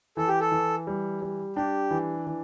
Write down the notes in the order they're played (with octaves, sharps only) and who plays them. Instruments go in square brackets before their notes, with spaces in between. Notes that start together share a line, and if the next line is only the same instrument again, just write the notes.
[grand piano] E3 [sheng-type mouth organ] A4
[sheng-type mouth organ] G4
A4
[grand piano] E3
G3
G3
[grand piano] D4 [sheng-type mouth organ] G4
[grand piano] E3
E3